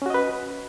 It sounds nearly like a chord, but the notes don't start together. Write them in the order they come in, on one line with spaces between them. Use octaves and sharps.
C#4 F#4 D#5 B4